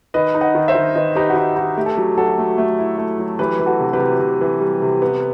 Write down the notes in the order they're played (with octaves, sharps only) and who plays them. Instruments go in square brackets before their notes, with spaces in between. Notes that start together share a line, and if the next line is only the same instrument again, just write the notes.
[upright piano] D#3 [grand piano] B4 D#5
[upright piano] D#4
[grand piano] D#5 F#5
[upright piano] D#3
[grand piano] C5 E5
[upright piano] D#3
[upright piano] D#3 [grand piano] B4 D#5
[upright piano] D#4 [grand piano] G4 B4
[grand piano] F#4
[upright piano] D#4 [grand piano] G4
[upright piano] D#4 [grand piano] F#4
[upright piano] A3 [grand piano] G4
[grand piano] A4
[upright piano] F#3 [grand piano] G4
[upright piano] F#3 [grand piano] F#4 A4
[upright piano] A3
A3
E4
A3
F#3
[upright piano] E3 [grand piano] G4 B4
[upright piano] E3
[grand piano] F#4 A4
[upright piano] C3
[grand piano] G4 B4
[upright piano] C3
C3
E3
G3
C3
B3